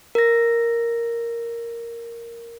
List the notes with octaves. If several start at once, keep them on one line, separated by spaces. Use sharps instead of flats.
A#4 A#6